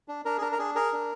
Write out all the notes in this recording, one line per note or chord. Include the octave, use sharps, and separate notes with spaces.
D4
D4 A#4
G#4
D4 A#4
A#4
D4 G#4
G#4 A#4
D4